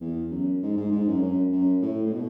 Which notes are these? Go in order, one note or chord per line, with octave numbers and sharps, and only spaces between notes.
E2
F#2
G#2
G#2
G#2
F#2
F#2
F#2
A2
A2
B2